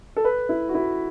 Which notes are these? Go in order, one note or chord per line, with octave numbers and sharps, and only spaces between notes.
A4
B4
E4
F#4
E4